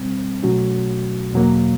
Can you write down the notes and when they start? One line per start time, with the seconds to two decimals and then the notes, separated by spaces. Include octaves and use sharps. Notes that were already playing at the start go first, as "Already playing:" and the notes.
Already playing: B2 G3 C4
0.43 B2 F#3 A3 C#4 F#4
1.32 E2 B2 F#3 A#3